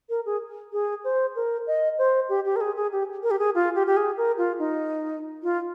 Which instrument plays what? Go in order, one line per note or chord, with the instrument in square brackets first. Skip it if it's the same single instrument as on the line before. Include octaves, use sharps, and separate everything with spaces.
[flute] A#4
G#4
G#4
C5
A#4
D#5
C5
G4
G4
A#4
G#4
G#4
G4
A#4
G4
G#4
F4
G4
G4
G#4
A#4
F4
D#4
F4